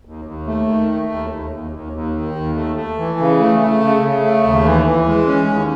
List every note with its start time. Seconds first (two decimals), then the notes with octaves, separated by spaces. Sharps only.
0.05 D#2
0.25 D#2
0.47 A3
0.67 D#3
0.89 A3
1.10 D#2
1.30 D#2
1.51 D#2
1.71 D#2
1.93 D#2
2.14 D#3
2.35 D#2
2.55 A3
2.76 A3
2.98 E3
3.19 C#3
3.39 A3
3.59 A3
3.80 C#3
4.02 C#3
4.23 A3
4.44 D#2
4.65 E3
4.86 E3
5.07 G#3
5.27 C#4
5.48 D#2